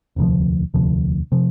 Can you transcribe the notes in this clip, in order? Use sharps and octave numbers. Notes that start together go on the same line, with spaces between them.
E1 D2 C3 F3
E1 D2 C3 F3
C3 F3